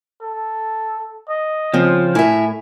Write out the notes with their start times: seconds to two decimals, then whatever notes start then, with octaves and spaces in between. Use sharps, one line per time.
0.22 A4
1.29 D#5
1.74 C#3 F3 C4
2.15 A2 E4 A#4 E5 G#5